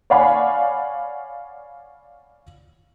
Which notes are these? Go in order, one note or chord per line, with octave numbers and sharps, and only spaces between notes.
C#5 D5 F5 F#5 G#5 B5